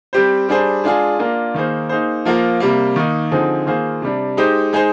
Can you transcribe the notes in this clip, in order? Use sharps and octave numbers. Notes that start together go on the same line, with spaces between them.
G3 C4 G4 C5
G3 D4 G#4 C5
G#3 D4 F4 G#4
A#3 D4 F4 A#4
D#3 A#3 D#4 G#4 C5
A#3 D#4 G#4 C5
F3 A#3 F4 A#4
C3 G3 A#3
D#3 A#3 D#4
D3 F3 C4 D#4 G#4
D#3 A#3 F4 G#4 C5
C3 G3 D4
G#3 D#4 G4 C5
G#3 D#4 G#4 C5